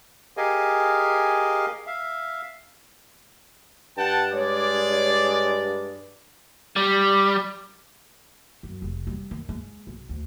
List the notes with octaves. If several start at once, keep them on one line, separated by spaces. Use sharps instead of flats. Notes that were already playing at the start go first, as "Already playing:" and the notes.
G4 G#4 A#4 D#5 F5 G#5
E5 F5
G2 F#5 G5 A5
G#3 C#5 D5
G3
F#2
F1
G3
D#3
G#3
B1
D2